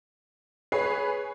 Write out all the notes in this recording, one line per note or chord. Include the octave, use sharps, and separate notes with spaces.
G#4 B4 C#5 C7